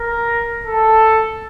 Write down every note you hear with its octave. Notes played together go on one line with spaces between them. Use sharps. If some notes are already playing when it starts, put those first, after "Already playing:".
Already playing: A#4
A4